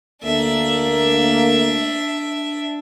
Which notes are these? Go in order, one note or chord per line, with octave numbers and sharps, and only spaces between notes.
D2 A3 A#3 D4 E5